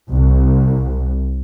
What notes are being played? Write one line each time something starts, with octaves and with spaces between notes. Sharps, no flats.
C2